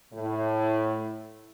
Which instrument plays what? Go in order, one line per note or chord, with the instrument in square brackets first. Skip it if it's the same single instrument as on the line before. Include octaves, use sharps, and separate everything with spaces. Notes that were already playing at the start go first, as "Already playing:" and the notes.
[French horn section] A2